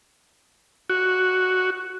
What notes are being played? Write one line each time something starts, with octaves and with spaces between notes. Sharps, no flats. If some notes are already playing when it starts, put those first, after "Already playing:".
F#4